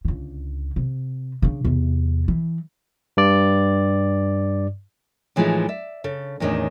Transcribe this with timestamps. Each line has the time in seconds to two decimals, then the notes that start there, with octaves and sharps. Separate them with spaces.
0.05 C#2 D3
0.76 C3
1.42 C#3 D4
1.64 E2 C3
2.28 E3
3.17 G2 D5
5.36 A2 E3 F3 G#3 D#4 E4
5.68 D5 E5
6.04 C#3 A4
6.40 E2 A2 D#3 C#4 D4